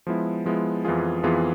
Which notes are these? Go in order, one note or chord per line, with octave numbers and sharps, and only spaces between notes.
F3 G#3 B3 E4
F3 G#3 B3 E4
F2 E3 B3 F4 G#4
F2 E3 B3 F4 G#4